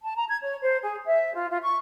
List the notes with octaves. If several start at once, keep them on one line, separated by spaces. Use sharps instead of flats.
A5
A#5
G#6
C#5
C5
G#4
E5
F4
F4
C#6